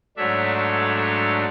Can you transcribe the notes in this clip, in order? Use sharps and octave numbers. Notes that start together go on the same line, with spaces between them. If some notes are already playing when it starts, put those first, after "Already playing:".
G#2 F#3 A3 D4 C#5 E5
A4 C#5
A4 C#5